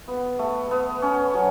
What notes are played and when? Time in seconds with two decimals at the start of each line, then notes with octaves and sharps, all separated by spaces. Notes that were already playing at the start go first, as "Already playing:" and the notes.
0.08 B3
0.39 A3
0.71 B3
1.02 C#4
1.34 F#3